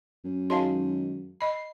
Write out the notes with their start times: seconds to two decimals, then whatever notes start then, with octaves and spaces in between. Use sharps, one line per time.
0.24 F#2
0.50 D#3 F#3 G#3 F5 A5 C6
1.41 D#5 B5 C7